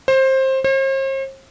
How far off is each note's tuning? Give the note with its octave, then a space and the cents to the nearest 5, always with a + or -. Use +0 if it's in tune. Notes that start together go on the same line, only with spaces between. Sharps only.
C5 +20
C5 +45